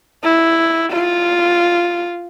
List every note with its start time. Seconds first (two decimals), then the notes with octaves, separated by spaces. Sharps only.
0.24 E4
0.92 F4